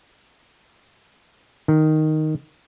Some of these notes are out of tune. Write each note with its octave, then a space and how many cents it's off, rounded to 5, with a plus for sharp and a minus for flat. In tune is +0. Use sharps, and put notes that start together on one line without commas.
D#3 +0